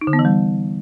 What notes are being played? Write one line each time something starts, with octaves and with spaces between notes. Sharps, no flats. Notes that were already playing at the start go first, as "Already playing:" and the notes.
D#4
D3
B3
E3
G3